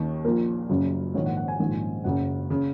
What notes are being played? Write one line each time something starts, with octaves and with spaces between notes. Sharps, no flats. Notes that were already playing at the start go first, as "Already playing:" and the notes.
Already playing: D#2 D#3
A#1 A#2 A#4
F#1 F#2 C#3
A#1 G#2 D#3 C#5
F#5
F#5
G#5
A#1 G#2 D#3
F#1 F#2 C#3 F#5
C#3